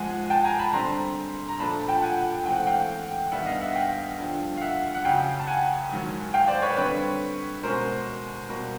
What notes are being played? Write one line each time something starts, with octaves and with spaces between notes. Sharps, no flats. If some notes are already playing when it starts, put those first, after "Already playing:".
Already playing: G#2 F3 G#3 F#5 G#5
G5 A5
G#5 A#5
A5 B5
D3 G3 C4 A#5 C6
A#5
A#2 F3 A3 D4 A5 B5
G5 A5
F#5 G#5
G#2 E3 A3 C4 G5
F#5
F5 G5
G2 D#3 G3 B3 D4 E5 F#5
D#5 F5
E5 F#5
F5 G5
G2 D3 F3
F5
E5 F#5
F#5
F#2 C#3 F#3 F5 G5
A5
F#5 G#5
G#2 D#3 F#3
F5 G5
C5 D5
B4 C#5
D3 G3 C4 B4 C#5
B2 G#3 C#4 A#4 C5
B2 G3 A#3